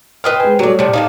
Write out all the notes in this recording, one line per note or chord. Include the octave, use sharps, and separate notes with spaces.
B4 C5 D#5 G5 D#6 F6
G#3 G#5
F#3 G3 A3 D5
A2 C3 D5
A2 D4 D#4 G4 D#5 F5